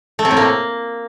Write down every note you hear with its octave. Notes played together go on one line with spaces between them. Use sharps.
A3
C3
A2
A#3